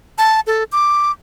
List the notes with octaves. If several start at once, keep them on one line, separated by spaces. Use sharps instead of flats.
A5
A4
D6